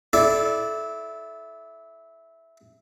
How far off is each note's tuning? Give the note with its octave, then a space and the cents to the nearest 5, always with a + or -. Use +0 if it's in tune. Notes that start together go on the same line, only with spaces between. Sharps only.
E4 +0 A4 -20 D5 +0